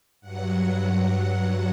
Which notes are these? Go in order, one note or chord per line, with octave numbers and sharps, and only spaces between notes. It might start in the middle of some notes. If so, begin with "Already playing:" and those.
G2 F#3 F#5